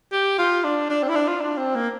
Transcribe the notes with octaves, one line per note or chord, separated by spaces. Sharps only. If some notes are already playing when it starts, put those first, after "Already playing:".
G4
F4
D4
D4
C4
E4
D4
F4
D4
C4
A#3